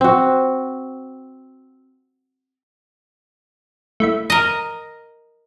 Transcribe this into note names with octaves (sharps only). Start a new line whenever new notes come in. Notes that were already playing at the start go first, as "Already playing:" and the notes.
C4 F#4
A3 E4 E5
A#4 D#5